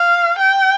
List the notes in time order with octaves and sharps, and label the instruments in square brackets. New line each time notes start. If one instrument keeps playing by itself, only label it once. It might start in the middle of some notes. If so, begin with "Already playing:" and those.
Already playing: [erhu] F5
G5